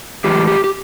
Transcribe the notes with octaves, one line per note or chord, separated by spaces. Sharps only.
A2 E3 G#3 G4
G4
G4